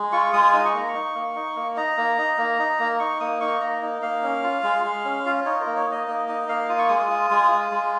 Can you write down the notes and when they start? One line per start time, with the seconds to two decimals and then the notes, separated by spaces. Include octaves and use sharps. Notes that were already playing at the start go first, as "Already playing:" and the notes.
Already playing: G#3
0.12 F4 C#6
0.33 G#3 D#6
0.53 D#4 D#6
0.65 C#6
0.74 A#3 A#5
0.88 C#6
0.94 D#4
1.15 A#3
1.36 D#4
1.56 A#3
1.76 D#4 A#5
1.97 A#3
2.18 D#4
2.38 A#3
2.59 D#4
2.79 A#3
2.99 D#4 C#6
3.20 A#3 D#6
3.41 D#4 C#6
3.61 A#3 A#5
3.82 D#4
4.02 A#3 F5
4.23 C#4
4.44 F4
4.63 G#3
4.84 G#3
5.05 C#4
5.26 F4
5.45 D#4 C#5
5.61 A#4
5.66 A#3
5.77 C#5
5.86 D#4
5.91 D#5
6.07 A#3 D#5
6.28 D#4 D#5
6.48 A#3 F5
6.69 F4 D#6
6.79 C#6
6.88 G#3 D#6
6.99 D#6
7.10 F4
7.31 G#3
7.51 F4
7.71 G#3